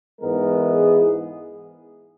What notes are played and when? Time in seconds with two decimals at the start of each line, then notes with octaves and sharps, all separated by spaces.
0.20 G#2 E3 G#3 B3 A#4
0.72 G#4